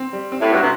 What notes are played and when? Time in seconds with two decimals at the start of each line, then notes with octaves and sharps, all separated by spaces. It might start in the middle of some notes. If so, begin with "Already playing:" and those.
Already playing: C4
0.13 G3
0.32 C4
0.41 A2
0.51 G2 F#4
0.61 C3